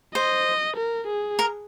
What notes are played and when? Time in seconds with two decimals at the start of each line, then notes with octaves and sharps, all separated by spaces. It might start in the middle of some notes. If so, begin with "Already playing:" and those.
0.15 C5 D#5
0.77 A#4
1.07 G#4
1.39 A#4